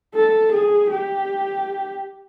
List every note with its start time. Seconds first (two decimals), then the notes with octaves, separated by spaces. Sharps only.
0.15 A4
0.53 G#4
0.90 G4